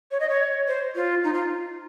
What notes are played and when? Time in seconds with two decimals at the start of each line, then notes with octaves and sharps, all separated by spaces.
0.11 C#5
0.20 D#5
0.29 C#5
0.68 C5
0.95 F4
1.24 D#4
1.34 F4